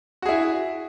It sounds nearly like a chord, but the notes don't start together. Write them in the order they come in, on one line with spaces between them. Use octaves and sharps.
F#4 G#4 E4